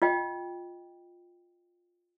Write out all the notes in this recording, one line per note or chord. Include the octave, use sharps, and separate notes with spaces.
F4 D#5 G5